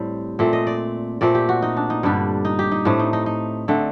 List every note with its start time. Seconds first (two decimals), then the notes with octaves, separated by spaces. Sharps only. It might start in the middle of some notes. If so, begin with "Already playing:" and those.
Already playing: A2 G3 C4 C5
0.39 A#2 A3 C4
0.53 D#5
0.67 D5
1.21 A#2 A3 C4 D5
1.35 G4
1.49 F#4
1.62 D#4
1.77 D4
1.90 D#4
2.03 G2 D3 G3 D4
2.45 D#4
2.59 G4
2.72 D#4
2.85 A2 A3 C4 D4
2.99 D#4
3.13 D#4
3.26 D#4
3.68 D3 A3 C4